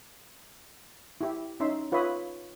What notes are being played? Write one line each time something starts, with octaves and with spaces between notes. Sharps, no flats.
E4 G4 E5
C#4 D#4 E5 C6
F4 B4 C#5 E5 B5 D#6